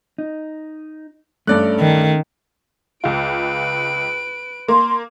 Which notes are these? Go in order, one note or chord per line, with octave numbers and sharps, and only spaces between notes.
D#4
G2 A3 C#4 D5 F#6
D#3
C#2 F4 B4 D7
A#3 C6